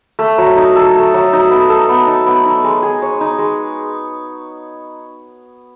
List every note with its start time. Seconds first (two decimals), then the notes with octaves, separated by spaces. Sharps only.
0.19 A3
0.38 F#3
0.57 D#4
0.76 A4
0.94 A3
1.14 F#3
1.33 D#4
1.51 B3
1.69 A4
1.89 B3
2.07 D#4
2.26 B3
2.46 D#4
2.64 G#3
2.83 G#4
3.02 C#5
3.21 D#4
3.39 G#3